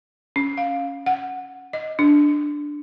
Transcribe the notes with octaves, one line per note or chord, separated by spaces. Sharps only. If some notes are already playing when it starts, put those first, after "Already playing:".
C#4
F5
F#5
D#5
D4